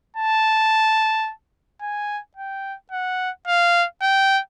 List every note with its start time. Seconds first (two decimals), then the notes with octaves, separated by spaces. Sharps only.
0.17 A5
1.82 G#5
2.37 G5
2.92 F#5
3.48 F5
4.02 G5